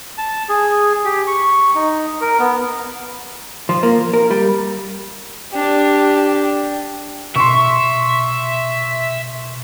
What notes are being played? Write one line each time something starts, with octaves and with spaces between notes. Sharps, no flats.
A5
G#4
G4
C#6
D#4
A#4
B3
F3
A#3
A#4
G3
D4 G4
B2 E5 C6 C#6